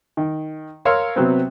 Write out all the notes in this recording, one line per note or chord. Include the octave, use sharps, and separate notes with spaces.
D#3
A#4 C#5 F5 C6 E6 F6
C3 F#3 B3 C4